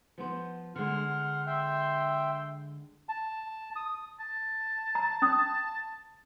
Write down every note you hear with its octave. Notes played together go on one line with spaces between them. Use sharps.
F3 B3 C5
D3 G#3 F#5 C6 F6
E5 G5 C6
A5
D#6
A5
A#5
C#4 D#6